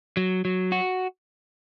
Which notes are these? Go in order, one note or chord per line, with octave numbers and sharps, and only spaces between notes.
F#3
F#3
F#4